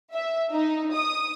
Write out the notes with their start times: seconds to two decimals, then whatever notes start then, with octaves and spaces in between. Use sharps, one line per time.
0.14 E5
0.52 D#4
0.94 D#6